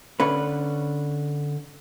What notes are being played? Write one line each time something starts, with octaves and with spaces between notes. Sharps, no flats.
D3 C#4 B4